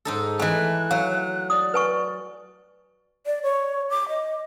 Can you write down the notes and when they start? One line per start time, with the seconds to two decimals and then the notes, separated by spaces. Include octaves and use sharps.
0.05 G#2 D#4 A4
0.40 E3 A3 D#5 G#5 F#6
0.91 F#3 F5
1.50 D5 D#6
1.74 B4 G#5 C#6
3.26 D5
3.43 C#5
3.90 D6
4.09 D#5